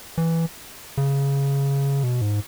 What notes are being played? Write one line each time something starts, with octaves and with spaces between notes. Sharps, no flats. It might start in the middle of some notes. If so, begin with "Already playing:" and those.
E3
C#3
B2
G#2